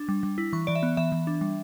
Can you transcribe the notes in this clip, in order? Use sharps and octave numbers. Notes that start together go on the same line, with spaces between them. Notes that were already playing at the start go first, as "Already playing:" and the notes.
Already playing: D4
G3
G3
E4
E3 C#6
E3 D5
E5
B3
E3 E5
E3
D4
G3